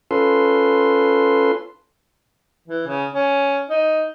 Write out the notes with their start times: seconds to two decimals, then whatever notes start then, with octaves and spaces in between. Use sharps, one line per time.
0.11 C#4 F4 A4 B4 C6
2.68 E3
2.87 C#3
3.14 C#4
3.70 D#4